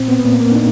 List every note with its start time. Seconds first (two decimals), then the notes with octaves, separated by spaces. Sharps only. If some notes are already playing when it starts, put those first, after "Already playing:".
Already playing: A#2 C4
0.08 B3
0.19 B3
0.24 A#2 A#3
0.40 A#3
0.51 D4
0.55 A#2 D#4